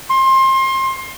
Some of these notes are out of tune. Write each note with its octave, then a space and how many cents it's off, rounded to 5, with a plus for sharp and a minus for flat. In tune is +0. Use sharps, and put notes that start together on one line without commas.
C6 +25